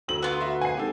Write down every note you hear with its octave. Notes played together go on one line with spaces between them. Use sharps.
D2 E6 F#7
B3 F4
F#4 E5
F#5 G#5 C7
G#1 G4 A4